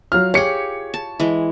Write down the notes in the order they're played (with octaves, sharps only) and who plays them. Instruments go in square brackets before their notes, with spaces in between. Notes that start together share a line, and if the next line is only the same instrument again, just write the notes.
[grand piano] F#3 F6 [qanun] F4
[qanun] G4 G#4 [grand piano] C#5 C#7
[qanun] A5
E3 G#3